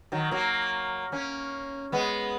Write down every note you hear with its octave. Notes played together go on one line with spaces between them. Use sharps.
D#3 F#3
F#3 A#3
A#3 C#4
G#3 B3